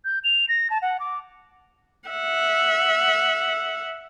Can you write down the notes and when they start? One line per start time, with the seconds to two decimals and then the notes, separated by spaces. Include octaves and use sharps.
0.05 G6
0.24 F7
0.49 A#6
0.70 A5
0.82 F#5
1.00 D6
2.09 E5 F#5